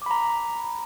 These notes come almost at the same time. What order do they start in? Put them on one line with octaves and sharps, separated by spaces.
D6 B5 A#5